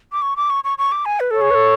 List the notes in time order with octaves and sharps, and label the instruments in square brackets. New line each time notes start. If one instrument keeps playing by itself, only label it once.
[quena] D6
C#6
D6
C#6
C#6
C#6
D6
G#5
B4
[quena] A4 [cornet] C#5
[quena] G#4
B4
A4